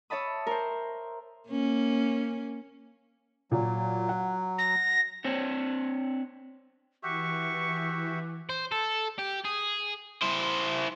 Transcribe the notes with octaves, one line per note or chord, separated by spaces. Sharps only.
C#5 E5 A5 B5 D#6
A#4 C5
A#3 C#4
A#2 F#3
F#5
A#6
C4 D4 C5 C#5
E3 F#4 G4 E5 C#6
C5
A4
G4
G#4
E4 C5